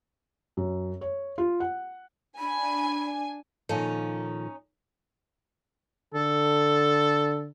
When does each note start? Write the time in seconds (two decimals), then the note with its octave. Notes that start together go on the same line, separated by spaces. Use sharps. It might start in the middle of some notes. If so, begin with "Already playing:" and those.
0.57 F#2
1.01 C#5
1.38 F4
1.60 F#5
2.38 D4 G#5 B5
3.69 A#2 D#3 F3 C#4 D#4 A4
6.14 D3 A4